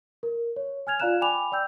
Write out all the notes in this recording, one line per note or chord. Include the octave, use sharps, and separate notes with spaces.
A#4
C#5
G#5 F6 G#6 F7
F4 D5 F5 A#5 F#6 E7
G5 G#5 B5 D6 F7
D5 G5 E6 G6